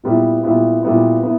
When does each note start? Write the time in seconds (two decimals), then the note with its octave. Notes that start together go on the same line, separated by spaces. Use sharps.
0.04 A#2 G3 B3 E4
0.44 A#2 G3 B3 E4
0.83 A#2 G3 B3 E4
1.23 B3 E4